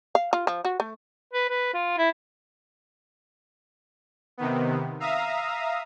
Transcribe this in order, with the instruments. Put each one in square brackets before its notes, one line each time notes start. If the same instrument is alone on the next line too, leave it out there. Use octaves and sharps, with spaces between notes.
[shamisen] F5
F4
F3
F#4
A3
[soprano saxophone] B4
B4
F4
E4
[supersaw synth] C3 D#3 B3
E5 F5 A#5 D#6